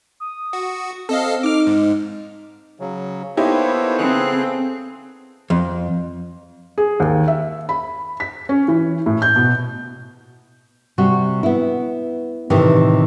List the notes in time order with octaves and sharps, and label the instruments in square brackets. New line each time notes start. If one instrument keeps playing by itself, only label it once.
[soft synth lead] D#6
[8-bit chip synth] F#4
[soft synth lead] C4 [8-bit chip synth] A4 D#5 F5
[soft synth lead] D#4 [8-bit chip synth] D6 F6
[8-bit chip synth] G#2
[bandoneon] C#3 F#3
[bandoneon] A#3 C5 C#5 [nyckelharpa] B3 A4 [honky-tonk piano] D#4 E4 G4
[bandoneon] C#3 G#4 F#6 [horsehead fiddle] C4
[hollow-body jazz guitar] F2
[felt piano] G#4
D#2
E5
B5
B6
C#4
E3
A2
G6
B2
[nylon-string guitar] C3 G3 F#4
B3 E4
A2 C3 D#3 E3